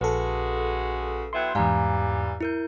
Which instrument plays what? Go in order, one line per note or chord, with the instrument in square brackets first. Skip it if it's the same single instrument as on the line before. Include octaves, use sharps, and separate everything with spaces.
[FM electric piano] A#1 A4 [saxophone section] C#3 G#3 F#4 [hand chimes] B4
[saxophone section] F#3 B3 E4 [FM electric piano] G5 C6
[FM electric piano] E2 G#2 [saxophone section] E3 G3 [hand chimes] F5 G#5 A#5
[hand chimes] E4 A#4 G6